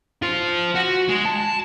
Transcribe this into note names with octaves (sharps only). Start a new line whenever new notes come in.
F4 C5
F#4
G#3
A5